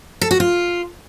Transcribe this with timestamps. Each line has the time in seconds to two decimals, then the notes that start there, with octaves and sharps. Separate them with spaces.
0.21 A4
0.31 F#4
0.40 F4